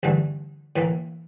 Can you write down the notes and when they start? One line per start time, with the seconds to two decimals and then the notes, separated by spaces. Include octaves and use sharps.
0.03 A1 G2 D3 A3
0.76 A2 E3 A#3